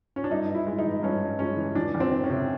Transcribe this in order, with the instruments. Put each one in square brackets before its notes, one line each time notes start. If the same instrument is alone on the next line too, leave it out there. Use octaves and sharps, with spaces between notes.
[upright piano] C#4
D4
G2 D#4
G2
E4
G#3
D#4
E3
G2 C#4
G2
G#3 C#4
E3
E2 D4
E2
C4
D#3
C#4
C3